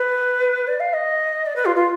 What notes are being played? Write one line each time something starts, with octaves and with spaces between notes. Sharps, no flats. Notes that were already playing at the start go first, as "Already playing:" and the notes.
Already playing: B4
D5
F5
D#5
D5
B4
F4
F4